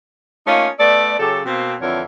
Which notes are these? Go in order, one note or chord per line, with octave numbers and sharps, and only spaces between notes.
A3 A#3 C#4 D#4 F4
A3 B3 A4 D5
C#3 F#3 G4 A4
B2 A#3 C4
F2 D3 E3 A#4 C#5